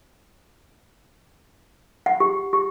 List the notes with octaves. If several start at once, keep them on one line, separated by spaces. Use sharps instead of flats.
F#5
G4
G4